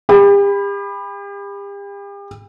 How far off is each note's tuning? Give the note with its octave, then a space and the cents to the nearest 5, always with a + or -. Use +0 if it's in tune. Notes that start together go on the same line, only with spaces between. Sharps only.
G4 +40 B5 +0